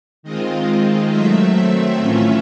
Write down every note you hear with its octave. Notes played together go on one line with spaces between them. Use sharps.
D#3 G#3 C4 F4 D#5
D#3 F#3 A3 C4 E5
A2 E3 A3 C#4 F4 E5